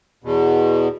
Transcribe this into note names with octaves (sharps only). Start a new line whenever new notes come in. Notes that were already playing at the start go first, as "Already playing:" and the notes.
E2 B2